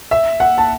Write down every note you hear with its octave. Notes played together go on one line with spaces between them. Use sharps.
E5
F#5
A5